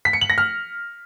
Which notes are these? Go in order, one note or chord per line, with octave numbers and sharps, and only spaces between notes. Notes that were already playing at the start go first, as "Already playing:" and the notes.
B6
C#7
F#7
A#6
F6